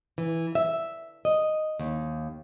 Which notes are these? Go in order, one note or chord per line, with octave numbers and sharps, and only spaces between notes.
E3
E5
D#5
D#2